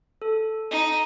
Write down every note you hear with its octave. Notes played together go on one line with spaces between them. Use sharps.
A4
D#4